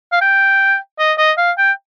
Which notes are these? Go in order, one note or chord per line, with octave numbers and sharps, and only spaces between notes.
F5
G5
D#5
D#5
F5
G5